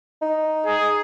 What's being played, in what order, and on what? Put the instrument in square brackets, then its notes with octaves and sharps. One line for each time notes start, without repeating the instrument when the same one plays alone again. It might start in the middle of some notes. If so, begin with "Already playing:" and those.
[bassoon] D#4
[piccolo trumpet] G#4